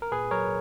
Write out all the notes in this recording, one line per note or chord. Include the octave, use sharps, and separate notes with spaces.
A#4
A#2 G#4 B4
F#3 A#4 C#5